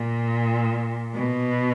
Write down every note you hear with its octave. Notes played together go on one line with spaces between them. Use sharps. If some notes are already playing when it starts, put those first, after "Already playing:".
Already playing: A#2
B2